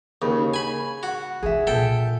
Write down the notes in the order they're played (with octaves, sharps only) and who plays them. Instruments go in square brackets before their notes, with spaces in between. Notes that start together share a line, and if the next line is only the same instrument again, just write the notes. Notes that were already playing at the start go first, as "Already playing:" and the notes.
[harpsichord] D#2 [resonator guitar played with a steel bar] C#3
[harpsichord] G#5 B5
F#4
[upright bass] D3 E3 [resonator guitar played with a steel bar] G#4 E5
[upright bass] A#2 [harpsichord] A4 G5